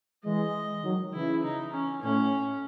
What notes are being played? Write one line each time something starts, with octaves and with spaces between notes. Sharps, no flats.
E3 G#3 D#5
D#3 F#3
C#3 E3 E4
D#4
C#4
A2 C#4